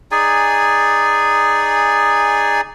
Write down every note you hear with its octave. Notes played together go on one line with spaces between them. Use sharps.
D#4 G#4 D5 G#5